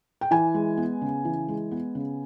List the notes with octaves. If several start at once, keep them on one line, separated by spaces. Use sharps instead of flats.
G5
E3 G#5
G#3
B3
C#3
E3
G#3
B3
C#3